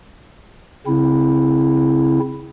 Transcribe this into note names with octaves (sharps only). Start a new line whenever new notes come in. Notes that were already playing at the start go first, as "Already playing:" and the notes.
C#3 C4 E4